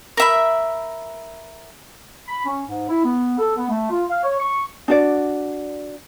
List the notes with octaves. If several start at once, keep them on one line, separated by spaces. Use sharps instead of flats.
A#4 E5 B5
B5
C#4
G#2
E4
B3
A4
B3
A3
F4
F5
C#5
C#6
D4 F#4 D5